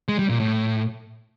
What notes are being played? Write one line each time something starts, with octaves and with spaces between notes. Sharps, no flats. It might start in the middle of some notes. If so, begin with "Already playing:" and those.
G#3
G3
A#2
A2